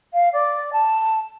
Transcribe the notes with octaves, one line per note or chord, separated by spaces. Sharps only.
F5
D5
A5